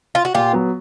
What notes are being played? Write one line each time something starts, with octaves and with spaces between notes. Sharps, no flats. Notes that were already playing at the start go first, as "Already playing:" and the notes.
F4
F#4
A#2 F4 G4
F#3 B3